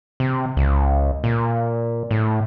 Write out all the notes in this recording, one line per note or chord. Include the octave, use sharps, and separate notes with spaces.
C3
C#2
A#2
A2